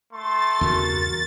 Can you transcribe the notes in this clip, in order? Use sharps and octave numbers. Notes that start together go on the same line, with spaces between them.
A3 C6 A6
E2 G2 C#3 F#4 A#4